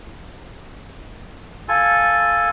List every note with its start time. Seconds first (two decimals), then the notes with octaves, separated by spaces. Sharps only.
1.68 F4 A4 G#5